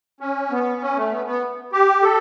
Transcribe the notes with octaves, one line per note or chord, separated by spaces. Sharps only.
C#4
B3
C#4
A3
B3
B3
G4
A4